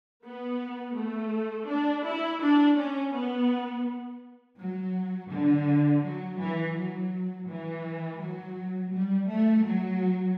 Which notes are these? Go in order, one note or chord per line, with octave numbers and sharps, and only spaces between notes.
B3
A3
D4
E4
D4
C#4
B3
F#3
D3
F#3
E3
F#3
E3
F#3
G3
A3
F#3